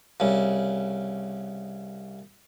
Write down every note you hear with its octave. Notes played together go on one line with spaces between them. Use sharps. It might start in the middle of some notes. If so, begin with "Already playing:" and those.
C2 C#3